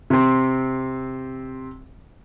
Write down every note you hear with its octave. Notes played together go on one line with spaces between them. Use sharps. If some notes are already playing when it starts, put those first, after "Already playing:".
C3 C4